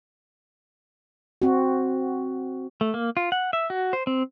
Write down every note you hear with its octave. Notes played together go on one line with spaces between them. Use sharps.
C4 F#4
A3
A#3
F4
F#5
E5
F#4
C5
C4